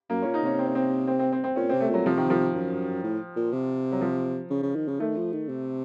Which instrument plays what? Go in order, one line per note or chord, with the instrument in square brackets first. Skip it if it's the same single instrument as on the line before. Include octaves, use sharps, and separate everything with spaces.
[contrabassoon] F#2 [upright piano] A#3
[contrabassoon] A#2 [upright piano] C#4
[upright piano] D#4
[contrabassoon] C3 [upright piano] C#4
[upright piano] C4
C#4
C4
C4
C4
C4
C4
[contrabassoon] A#2 [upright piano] C#4
[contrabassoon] C3 [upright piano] C4
[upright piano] A3
[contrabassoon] A#2 [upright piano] F#3
[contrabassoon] C3 [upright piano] F3
[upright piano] D#3
F3
[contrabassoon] F#2
A2
A#2
C3
[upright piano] F#3
F3
[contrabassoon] C#3
C#3
D#3
C#3
[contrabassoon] D#3 [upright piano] A3
[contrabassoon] F3
D#3
C3